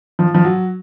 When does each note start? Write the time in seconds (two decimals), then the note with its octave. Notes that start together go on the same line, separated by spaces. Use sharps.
0.19 F3
0.35 F3
0.44 F#3